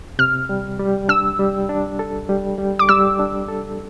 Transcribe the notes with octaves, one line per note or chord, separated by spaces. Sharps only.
C3 F6
G3
G3
D4 E6
G3
D4
A4
G3
G3
D6
G3 E6
D4
A4